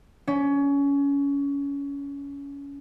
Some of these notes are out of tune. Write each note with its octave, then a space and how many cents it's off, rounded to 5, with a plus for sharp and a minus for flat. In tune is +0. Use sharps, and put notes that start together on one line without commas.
C#4 +25